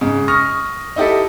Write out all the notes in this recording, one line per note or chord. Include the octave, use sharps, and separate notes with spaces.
G#2 C#3
C#6 D#6 F6 A#6
D#4 E4 G4 A4